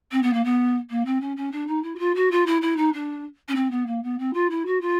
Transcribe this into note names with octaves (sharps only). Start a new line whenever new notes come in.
C4
B3
A#3
B3
A#3
C4
C#4
C#4
D4
D#4
E4
F#4
F4
F#4
F4
E4
E4
D#4
D4
C#4
C4
B3
A#3
B3
C4
F4
E4
F#4
F4